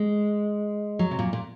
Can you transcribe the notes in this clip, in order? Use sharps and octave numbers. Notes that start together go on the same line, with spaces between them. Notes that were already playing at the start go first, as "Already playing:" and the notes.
Already playing: G#3
F#3
C3
A#2
A#2